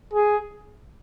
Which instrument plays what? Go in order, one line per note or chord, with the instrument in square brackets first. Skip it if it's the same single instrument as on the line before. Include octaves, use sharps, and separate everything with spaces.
[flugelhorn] G#4